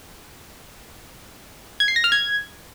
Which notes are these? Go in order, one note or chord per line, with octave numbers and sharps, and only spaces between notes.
G#6
C7
A#6
F6
G#6